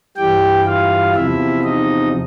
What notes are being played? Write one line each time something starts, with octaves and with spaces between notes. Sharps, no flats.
G2 E3 G3 G4 G5
F4 F5
E2 C3 F3 E4 E5
D#4 D#5